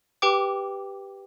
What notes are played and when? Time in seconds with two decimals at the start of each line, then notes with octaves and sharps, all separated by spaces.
0.22 G4 B4 G5 D6